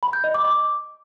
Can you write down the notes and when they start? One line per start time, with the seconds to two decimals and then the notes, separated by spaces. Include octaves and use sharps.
0.03 B5
0.13 G6
0.24 D#5
0.34 D6
0.45 D6